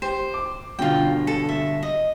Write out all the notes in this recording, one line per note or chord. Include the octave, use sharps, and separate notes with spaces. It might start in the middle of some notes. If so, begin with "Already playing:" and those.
G4 C5
D6
G1 B2 D3 F4 G5
A4
E5
D#5